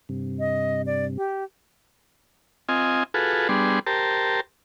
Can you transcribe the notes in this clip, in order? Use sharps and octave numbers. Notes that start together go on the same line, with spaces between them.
G2 C3
D#5
D5
G4
C4 F4 D#5 G#5
F4 F#4 G#4 A4 B4
G3 B3 D4 G#4 C6
G4 A#4 C5 A5